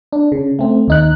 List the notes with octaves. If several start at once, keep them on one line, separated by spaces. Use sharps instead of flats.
D4
C#3
A3 C4
D#2 D#4 F#6